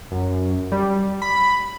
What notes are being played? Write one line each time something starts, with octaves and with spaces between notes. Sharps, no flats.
F#2
G3
B5